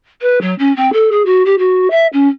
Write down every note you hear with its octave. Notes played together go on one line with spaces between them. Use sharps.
B4
F#3
C#4
C4
A4
G#4
F#4
G4
F#4
E5
C#4